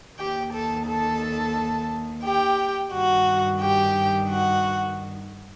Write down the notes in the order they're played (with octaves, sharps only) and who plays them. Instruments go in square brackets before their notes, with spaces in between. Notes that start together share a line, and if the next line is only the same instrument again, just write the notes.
[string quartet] D#2 D#3 G4 G5
A4 A5
A4 A5
G4 G5
G2 D#3 F#4 F#5
G4 G5
F#4 F#5